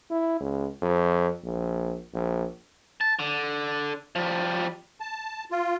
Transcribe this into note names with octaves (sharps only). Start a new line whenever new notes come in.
E4
C#2
F2
A#1
A#1
A5
D3
F3 G3
A5
F4